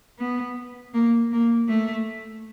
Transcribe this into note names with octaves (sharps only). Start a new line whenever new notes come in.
B3
A#3
A#3
A3